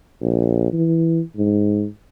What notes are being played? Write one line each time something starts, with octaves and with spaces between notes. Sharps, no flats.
A#1
E3
G#2